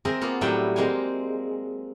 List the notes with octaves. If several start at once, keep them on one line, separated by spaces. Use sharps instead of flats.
C4 G#4 A#4 E5 G#5
A#3 B3 F4
A2 F#3 G3 E5 F#5 G5
G#3 A#3 C4 F5 G5 G#5